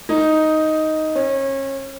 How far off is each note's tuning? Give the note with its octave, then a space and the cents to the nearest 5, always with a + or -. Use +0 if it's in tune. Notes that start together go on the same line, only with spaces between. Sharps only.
D#4 +5
C#4 -30